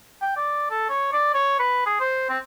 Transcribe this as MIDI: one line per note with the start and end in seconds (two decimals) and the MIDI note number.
0.22 0.33 79
0.37 0.66 74
0.70 0.87 69
0.89 1.09 73
1.13 1.30 74
1.34 1.58 73
1.59 1.86 71
1.86 1.96 68
2.00 2.28 72
2.29 2.38 60